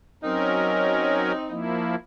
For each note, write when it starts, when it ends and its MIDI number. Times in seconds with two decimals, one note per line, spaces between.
0.23 1.32 54
0.23 1.76 60
0.23 1.32 61
0.23 1.76 63
0.23 1.32 70
1.50 1.96 53
1.50 1.96 58
1.50 1.96 64